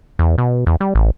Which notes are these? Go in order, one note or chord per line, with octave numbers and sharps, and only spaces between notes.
E2
B2
E2
G3
A1